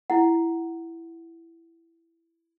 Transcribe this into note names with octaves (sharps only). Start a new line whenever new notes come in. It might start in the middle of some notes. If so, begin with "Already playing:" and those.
E4 F#5